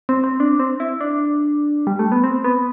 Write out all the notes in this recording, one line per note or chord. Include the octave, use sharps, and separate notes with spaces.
C4
C4
D4
C4
E4
D4
G3
A3
B3
C4
B3